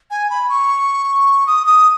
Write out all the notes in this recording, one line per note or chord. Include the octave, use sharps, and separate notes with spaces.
G#5
B5
C#6
D#6
D#6